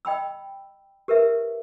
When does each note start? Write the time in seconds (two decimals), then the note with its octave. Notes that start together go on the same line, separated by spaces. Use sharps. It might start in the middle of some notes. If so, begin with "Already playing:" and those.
0.05 D#5 G5 B5 E6
1.08 G4 A#4 B4 E5